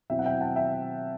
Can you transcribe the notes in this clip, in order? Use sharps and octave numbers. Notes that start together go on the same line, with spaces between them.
B2 F#3 C4 E4 E5 G5
F#5
E5 G5
F#5 A5
E5 G5